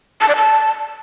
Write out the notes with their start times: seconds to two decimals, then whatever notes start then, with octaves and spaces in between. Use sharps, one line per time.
0.21 A5
0.28 D5
0.36 A5